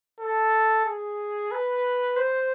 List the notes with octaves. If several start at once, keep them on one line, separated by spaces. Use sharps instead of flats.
A4
G#4
B4
C5